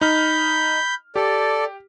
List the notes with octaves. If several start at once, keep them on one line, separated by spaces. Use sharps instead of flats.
D#4 B5 F6 G6
G4 A4 D5